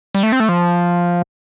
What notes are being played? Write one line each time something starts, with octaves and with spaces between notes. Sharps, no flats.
G3
A3
C4
A3
F3